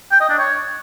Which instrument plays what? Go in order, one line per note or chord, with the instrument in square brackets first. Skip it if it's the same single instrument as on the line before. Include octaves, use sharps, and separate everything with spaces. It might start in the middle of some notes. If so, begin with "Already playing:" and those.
[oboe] G5
D#5
D4
C#5